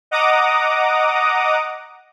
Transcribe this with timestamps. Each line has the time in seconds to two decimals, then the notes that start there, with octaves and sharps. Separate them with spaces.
0.11 D#5 F#5 A#5 D6 D#6